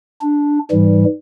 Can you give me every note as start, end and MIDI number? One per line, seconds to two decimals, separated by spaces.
0.21 0.59 62
0.71 1.05 44
0.71 1.05 52
0.71 1.05 55